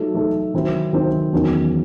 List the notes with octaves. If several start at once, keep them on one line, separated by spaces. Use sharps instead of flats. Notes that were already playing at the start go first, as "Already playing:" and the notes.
Already playing: F#3 A3 D#4 A4
F#3 A3 D#4 A4
D#3 F#3 C4 E4
D#3 F#3 C4 E4
E2 D#3 F#3 C#4